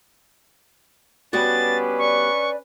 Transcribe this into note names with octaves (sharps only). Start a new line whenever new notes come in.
G3 B3 C#4 D4 F#4 B4 A6
D5 C#6